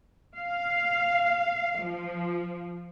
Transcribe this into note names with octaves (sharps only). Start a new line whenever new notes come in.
F5
F3